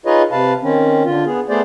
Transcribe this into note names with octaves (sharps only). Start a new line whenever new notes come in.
D#4 F4 G#4 B4 C#5 D#5
C3 B4 F5 A5
D#3 C4 C#4
D3 F4
B3 G#4
A3 B3 G#4 C5 D5